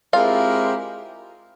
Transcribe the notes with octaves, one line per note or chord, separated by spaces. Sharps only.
G#3 C4 E4 F4 G4 A#4 F5